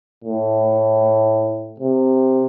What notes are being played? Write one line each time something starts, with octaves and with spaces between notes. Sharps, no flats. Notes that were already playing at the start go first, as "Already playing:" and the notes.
A2
C3